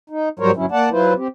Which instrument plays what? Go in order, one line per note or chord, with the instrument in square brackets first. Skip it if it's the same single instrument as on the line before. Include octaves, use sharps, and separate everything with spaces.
[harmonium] D#4
G#2 F#3 G3 A#4 C5 C#5
D2 G2 F#3 C#4 E4
A#3 D5 F#5 A5
F#3 E4 F4 B4 C5
C4 G4